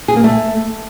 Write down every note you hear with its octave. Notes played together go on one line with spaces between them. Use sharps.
G#4
A#3
A3